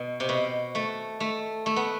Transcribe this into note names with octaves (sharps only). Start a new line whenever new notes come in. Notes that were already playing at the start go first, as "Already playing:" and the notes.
Already playing: B2
C3
B2
A3
A3
A3
B3